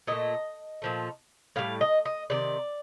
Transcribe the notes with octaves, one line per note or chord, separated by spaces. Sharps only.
A#2 A3 D#5
A#2 F3 A3
A2 G3 F5
D#5
D#5
C3 D#3 D5